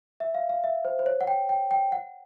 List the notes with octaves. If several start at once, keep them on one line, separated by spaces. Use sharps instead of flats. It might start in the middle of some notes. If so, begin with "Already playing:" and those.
E5
F5
F5
E5
C5
C5
C#5
F#5
G5
G5
G5
F#5